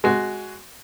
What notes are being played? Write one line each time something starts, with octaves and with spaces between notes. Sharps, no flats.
G#3 F#4